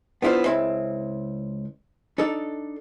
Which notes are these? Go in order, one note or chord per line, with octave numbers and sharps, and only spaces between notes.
B3 D4 E4 F4 C5
C#2 C4 E4 B5
D4 D#4 A4